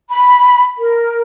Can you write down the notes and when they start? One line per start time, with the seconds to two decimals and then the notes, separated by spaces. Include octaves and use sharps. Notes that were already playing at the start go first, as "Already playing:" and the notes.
0.10 B5
0.78 A#4